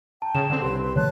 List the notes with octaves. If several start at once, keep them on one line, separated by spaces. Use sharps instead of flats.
G5 A5 A#5
C#3 E7
D3 C4
C2 G4 B4 C#5 C6
B5 C6
C#3 E3 G#3 C#5 A5 F#6